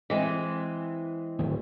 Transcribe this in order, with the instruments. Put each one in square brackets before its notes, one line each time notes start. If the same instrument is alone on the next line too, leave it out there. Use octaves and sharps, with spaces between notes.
[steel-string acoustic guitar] E3 G#3 C4
[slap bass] D1 G#1 D#2